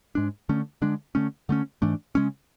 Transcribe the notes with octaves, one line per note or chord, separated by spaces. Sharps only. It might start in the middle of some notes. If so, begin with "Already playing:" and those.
G#2 G#3 D4
D3 A3 C#4
D3 G#3 D4
D3 A3 C#4
D3 A3 C#4
G#2 E3 A3 D4
C#3 G#3 C#4